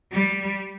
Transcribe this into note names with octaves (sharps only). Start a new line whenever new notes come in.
G3